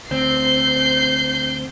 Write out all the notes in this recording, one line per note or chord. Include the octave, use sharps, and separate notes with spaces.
D2 C4 G6 C7